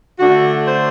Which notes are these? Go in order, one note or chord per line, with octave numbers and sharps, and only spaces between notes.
D3 A3 D4 F#4
C5